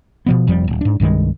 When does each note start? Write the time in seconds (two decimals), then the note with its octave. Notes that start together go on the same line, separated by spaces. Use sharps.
0.26 B2 F3 B3
0.47 F1 F2 F3 G3
0.68 D1
0.81 G#2 D4
1.00 C2 G2 D#3 G#3